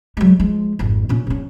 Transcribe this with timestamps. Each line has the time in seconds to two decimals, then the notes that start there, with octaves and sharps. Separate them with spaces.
0.17 F#3 G#3
0.40 F3 G#3
0.79 G#1 F2
1.09 A#2 C#4
1.27 A#1 C#4